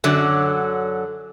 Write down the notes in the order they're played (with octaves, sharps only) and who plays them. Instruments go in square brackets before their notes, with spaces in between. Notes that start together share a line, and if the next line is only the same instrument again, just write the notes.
[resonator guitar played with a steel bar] F#2 D3 F#3